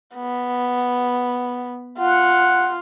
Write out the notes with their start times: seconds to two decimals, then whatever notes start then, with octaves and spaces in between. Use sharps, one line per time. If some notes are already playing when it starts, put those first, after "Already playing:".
0.15 B3
1.98 F4 F#5